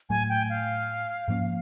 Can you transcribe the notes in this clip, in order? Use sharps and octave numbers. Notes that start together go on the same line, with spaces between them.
A2 F#3 A3 G#5
G5
F5
G#2 F3 A#3 C#4